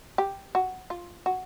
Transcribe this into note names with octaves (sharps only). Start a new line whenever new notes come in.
G4
F#4
F4
F#4